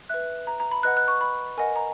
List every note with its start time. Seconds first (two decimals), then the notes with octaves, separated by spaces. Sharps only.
0.09 B4 E5 F#6
0.47 A#5
0.60 A#5
0.71 B5
0.83 B4 D#5 F#5 F#6
0.97 F#6
1.08 C#6
1.21 B5
1.57 A#4 D#5 F#5 G#5
1.76 A#5